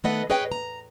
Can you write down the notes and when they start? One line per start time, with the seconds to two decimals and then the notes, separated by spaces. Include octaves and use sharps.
0.04 D#3 A3 B3 B4 D#5 F#5
0.30 G#4 B4 C#5 D#5 G5
0.52 A#5